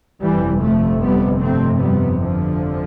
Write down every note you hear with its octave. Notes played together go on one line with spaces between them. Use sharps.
G1 F2 C3 E3 G3
F3 A3
G3 B3
A3 C4
G3 B3
D3 F3